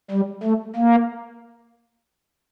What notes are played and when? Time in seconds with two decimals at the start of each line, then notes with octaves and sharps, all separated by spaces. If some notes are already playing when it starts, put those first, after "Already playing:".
0.11 G3
0.43 A3
0.76 A#3